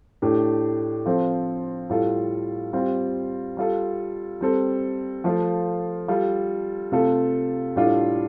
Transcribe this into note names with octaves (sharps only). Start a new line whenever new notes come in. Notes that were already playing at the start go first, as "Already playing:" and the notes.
A2 A3 D4 G4
F3 C4 F4 A4
A2 G3 F4 A4
G3 C4 F4
G3 F4 A4
G3 C4 A4
F3 A3 F4
G3 F4 A4
C3 A3 F4 A4
A2 G3 D4 F4 A4